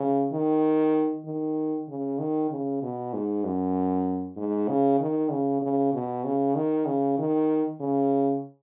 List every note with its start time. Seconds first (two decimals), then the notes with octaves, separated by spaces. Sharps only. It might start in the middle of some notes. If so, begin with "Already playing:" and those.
Already playing: C#3
0.32 D#3
1.25 D#3
1.89 C#3
2.19 D#3
2.50 C#3
2.82 B2
3.13 G#2
3.44 F#2
4.37 G#2
4.68 C#3
5.00 D#3
5.31 C#3
5.62 C#3
5.94 B2
6.25 C#3
6.55 D#3
6.86 C#3
7.18 D#3
7.80 C#3